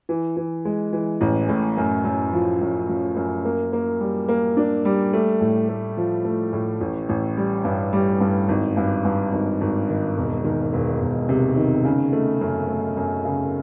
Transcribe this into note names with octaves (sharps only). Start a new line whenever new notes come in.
E3
E3
G#3
E3
A1
A2
F#2
F#2
F3
F#2
F3
F#2
A#3
A#3
G3
A#3
D4
G3
A3
A2
A3
F3
A3
A2
A1
A1
G3
G2
G3
G2
G#1
G2
G2
G#1
G#1
D#3
E1
D#3
E1
E1
C3
D#3
C#3
A3
F#2
A3
F#2
C#3